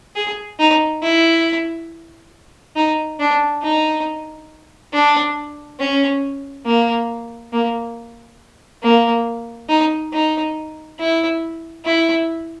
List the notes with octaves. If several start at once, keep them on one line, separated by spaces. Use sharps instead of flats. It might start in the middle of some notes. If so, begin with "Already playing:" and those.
G#4
D#4
E4
D#4
D4
D#4
D4
C#4
A#3
A#3
A#3
D#4
D#4
E4
E4